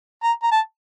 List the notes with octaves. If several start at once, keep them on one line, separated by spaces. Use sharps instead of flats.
A#5
A#5
A5